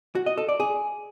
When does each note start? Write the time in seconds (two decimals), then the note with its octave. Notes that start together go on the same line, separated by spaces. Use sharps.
0.15 F#4
0.26 D#5
0.37 A4
0.49 D5
0.60 G#4